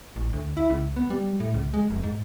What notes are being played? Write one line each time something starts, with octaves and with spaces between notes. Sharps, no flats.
A1
D2
E4
C#2
B3
G3
A2
C#2
G#3
F1
G#2